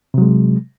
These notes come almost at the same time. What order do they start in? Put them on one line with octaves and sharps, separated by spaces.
C3 F#3 G#3